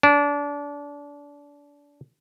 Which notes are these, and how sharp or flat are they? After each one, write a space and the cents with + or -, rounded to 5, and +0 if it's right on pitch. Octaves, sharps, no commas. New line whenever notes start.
D4 -25